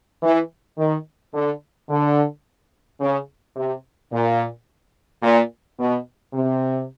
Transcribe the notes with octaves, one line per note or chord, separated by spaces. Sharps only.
E3
D#3
D3
D3
C#3
C3
A#2
A#2
B2
C3